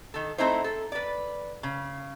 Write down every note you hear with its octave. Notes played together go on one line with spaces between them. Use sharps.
D#3 A4
A3 C4 D#4 E4 C5
A4
B4 D5
C#3